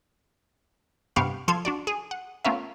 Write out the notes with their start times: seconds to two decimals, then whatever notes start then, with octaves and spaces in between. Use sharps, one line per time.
1.16 G2 C3 B3 G4 F5 C#6
1.48 F3 A4 F5 C6 G#6
1.65 D4 F#4 D5
1.87 G#4
2.11 F#5
2.45 A3 B3 C#4 F4 A#4 E5